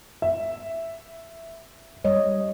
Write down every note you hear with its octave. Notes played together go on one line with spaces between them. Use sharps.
E5
G3 C#5 D#5